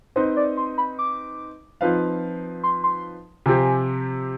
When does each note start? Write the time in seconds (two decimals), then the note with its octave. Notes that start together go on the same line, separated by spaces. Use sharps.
0.16 C4 D#4 B4 C5 D#5
0.37 D5
0.57 C6
0.78 B5
0.99 D6
1.81 F3 C4 D#4 B4 F5
2.63 C6
2.84 C6
3.46 C3 F3 C4 G4 G#5